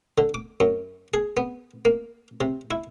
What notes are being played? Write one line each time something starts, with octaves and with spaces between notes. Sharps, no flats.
D3
D6
F#2
G#4
B3
A#3
C3
E4